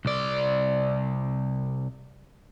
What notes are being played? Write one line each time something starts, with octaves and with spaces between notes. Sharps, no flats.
C2 D5